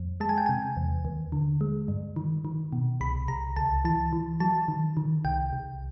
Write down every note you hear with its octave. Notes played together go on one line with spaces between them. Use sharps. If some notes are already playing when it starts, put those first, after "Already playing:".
Already playing: F2
G#3 A5
G#5
G5
C3 G#5
E2
D#2
D3
G#3
G2
D#3
D#3
B2
C2 B5
C2 A#5
C#2 A5
E3 A5
E3
F#3 A5
D#3
D#3
C2 G5
C2